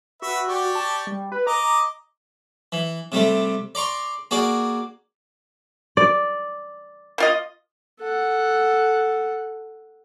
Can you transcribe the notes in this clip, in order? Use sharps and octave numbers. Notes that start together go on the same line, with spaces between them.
F#4 B4 E5
G4 D5 C#6
A5
G3
B4
D#5 A#5 D6
E3
C3 G3 A3
D5 A#5 C6 C#6
A#3 F#4 G#4 D5
D5
A#3 F4 D#5
A4 F#5